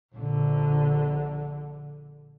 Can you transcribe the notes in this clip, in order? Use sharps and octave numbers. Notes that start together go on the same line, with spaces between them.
A#1 D3